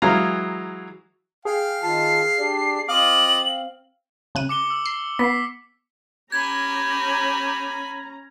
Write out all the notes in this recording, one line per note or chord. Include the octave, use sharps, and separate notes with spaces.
E3 F#3 G#3 F5 A#5
G#4 F5 G5
D#3 F4 A5 C7
D4 G4 D5
C4 F4 D#5 F5 D6 F#7
C#3 F#6 D#7
D6 C#7 G7
E6
C7
B3 B6 C7
C#4 G4 G#5 A#5 B5 G#6